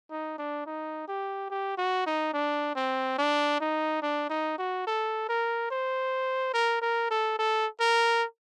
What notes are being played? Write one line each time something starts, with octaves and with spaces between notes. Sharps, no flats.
D#4
D4
D#4
G4
G4
F#4
D#4
D4
C4
D4
D#4
D4
D#4
F#4
A4
A#4
C5
A#4
A#4
A4
A4
A#4